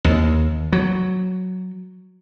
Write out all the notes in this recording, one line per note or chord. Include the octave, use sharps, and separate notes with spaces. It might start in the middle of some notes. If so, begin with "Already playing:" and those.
D#2
F#3